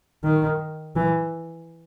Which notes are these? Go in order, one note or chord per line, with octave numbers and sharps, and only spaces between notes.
D#3
E3